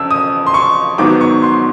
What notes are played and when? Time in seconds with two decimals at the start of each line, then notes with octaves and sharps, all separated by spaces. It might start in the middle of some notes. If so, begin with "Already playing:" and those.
Already playing: F2 C#3 E6
0.11 D#6
0.46 C6
0.54 C#6
0.98 G#2 D#3 F#3 B3 D6
1.21 C#6
1.42 C6